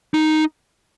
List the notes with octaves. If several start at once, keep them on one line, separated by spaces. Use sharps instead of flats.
D#4